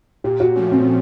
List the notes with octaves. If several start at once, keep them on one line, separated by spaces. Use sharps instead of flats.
A#2 G4
F#4
F3 A3 C#4
C4